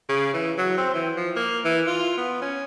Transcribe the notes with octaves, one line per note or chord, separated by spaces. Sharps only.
C#3
E3
F#3
C4
E3
F3
A#3
E3
F4
B3
C#4